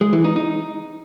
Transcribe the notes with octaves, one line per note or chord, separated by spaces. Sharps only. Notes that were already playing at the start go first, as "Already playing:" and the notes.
G#3
E3
D#4
D#4